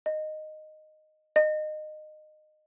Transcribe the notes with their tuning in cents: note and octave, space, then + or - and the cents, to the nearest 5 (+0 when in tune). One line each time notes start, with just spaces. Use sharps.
D#5 -10
D#5 -20